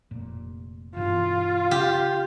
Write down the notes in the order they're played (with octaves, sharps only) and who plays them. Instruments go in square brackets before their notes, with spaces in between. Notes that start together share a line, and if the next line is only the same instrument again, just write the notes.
[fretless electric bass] F1 A#2
[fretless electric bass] G2 B2 E3 [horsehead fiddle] F4
[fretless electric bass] C#3 [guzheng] G4